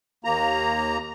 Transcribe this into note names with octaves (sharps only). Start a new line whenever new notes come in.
D#2 A#3 A#5